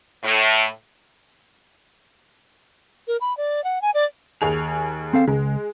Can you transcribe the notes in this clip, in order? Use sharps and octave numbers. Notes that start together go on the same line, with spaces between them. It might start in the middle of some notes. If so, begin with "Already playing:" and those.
A2
A#4
B5
D5
F#5
G#5
D5
D#2 G#4 F7
C4 A4 F5
C#2 G#3